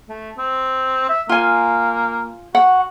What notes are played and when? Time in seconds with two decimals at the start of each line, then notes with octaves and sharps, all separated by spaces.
0.09 A3
0.38 C4
1.09 E5
1.29 A#3 F4 G#5
2.55 F#4 F#5